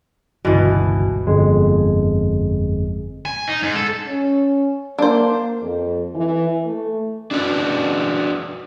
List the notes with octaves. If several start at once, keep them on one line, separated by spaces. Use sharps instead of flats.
G1 C#2 G2 B2 E3
G1 F2 G#3
G#5
D#4
G#2
A4
C#4
A#3 D4 C5
F2
E3
A3
D4 F#4 B4